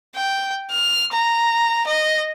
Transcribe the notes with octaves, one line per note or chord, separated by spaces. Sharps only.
G5
F6
A#5
D#5